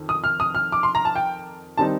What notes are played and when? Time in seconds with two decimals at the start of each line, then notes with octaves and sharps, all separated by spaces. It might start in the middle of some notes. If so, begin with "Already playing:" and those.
Already playing: F2 D#3
0.09 D#6
0.24 F6
0.40 D#6
0.55 F6
0.72 D6
0.83 C6
0.95 A#5
1.05 A5
1.16 G5
1.78 D#3 G3 C4 D#4 A5